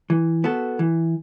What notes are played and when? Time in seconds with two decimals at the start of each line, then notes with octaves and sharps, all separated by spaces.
0.10 E3
0.44 B3 F#4 A4
0.79 E3